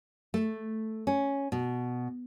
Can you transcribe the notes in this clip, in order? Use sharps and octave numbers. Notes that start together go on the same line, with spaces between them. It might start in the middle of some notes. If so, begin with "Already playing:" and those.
A3
C#4
B2